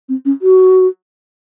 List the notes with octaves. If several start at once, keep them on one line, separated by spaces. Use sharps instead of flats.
C4
C#4
F#4